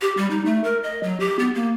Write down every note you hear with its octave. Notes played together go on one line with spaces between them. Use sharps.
G4
G3
D#4
A3
A#4
D#5
F#3
G4
B3
A#3